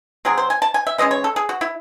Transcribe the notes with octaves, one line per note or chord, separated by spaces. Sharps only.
C3 F#3 C4 G#4
C5
G#5
A5
G#5
E5
E3 G#3 C#4 D#5
C#5
A4
G#4
F#4
E4